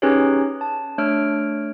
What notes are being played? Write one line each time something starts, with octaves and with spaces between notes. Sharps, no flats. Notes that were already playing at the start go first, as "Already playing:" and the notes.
C#4 D#4 G4 G#4 B4 C#5
A5
A3 D4 C#5 F6 D7